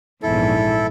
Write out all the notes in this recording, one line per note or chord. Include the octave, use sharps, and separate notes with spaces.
A#1 E2 G#2 E4 A4